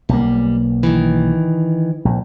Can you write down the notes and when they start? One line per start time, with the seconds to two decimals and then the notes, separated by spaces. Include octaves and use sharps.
0.09 B1 G3 A#3
0.83 D#3 E3
2.05 A#1